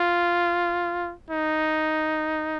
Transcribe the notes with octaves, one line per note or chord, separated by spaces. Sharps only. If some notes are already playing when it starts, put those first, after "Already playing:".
Already playing: F4
D#4